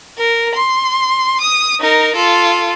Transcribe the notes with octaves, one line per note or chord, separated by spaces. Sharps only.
A#4
C6
D#6
D#4 A#4
F4 A4